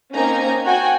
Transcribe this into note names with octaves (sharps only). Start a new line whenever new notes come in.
A#3 C4 C#4 D#4 G#5 A#5
F#4 G5 G#5